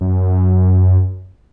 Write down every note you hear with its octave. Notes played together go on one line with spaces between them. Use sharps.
F#2